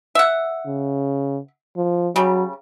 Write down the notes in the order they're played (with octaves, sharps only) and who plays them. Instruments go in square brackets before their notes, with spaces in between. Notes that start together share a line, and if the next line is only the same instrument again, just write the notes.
[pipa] E5 F#5
[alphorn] C#3
F3
[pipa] C#3 G3 [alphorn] F#3